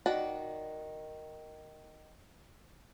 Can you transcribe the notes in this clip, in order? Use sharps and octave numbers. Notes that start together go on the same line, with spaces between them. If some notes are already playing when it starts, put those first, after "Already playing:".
D#3 F#4 D5